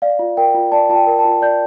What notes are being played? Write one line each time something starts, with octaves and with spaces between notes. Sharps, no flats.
D5 F5
F4
A#4 G5
F4
D5 A5
F4 A5
G5
A#4
A5
F4
D5 G6